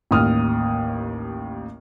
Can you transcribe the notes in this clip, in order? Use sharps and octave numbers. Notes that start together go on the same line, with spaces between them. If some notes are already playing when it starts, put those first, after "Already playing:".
A1 D#2 D#6 F6